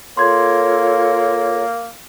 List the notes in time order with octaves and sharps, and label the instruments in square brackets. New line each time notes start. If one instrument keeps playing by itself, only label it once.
[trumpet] A#3 [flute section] F4 A4 C#5 [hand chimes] C6 G#6